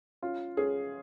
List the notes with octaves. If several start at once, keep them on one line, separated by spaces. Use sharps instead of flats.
C#4 F4
C#4 G#4